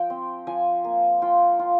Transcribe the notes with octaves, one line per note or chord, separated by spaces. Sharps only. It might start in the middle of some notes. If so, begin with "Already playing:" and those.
Already playing: F3 G5
C4
F3 G#5
A#3
F4 G5
F4